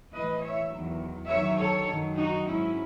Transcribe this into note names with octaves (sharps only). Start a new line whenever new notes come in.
A2 E3 B4 D#5
C#5 E5
E2 D#3 F#3
F#2 D#3 F#3 C#5 E5
A4 C#5
F#2 D#3 F#3
D#4 F#4
G#2 F#3 C#4 E4